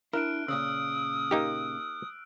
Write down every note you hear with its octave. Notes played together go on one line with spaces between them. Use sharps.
D4 E4 A#4 F6 F#6 D7
A#2 C#3 D#6 E6
A#3 D#4 G4